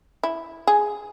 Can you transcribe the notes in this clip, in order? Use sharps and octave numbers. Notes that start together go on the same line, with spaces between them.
E4
G#4